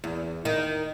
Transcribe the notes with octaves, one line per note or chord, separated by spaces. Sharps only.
E2
D#3